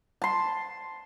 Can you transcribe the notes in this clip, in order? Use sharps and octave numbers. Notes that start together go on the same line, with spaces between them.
A5 C6